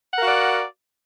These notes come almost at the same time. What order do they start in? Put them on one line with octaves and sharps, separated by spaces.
F#5 A#4 F5 F#4 D5